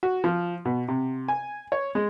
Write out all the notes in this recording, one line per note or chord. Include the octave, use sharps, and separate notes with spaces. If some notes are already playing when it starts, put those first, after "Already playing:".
F#4
F3
B2
C3
G#5
C#5
G#3